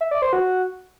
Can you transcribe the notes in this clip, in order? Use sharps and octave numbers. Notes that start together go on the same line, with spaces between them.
E5
D5
C5
F#4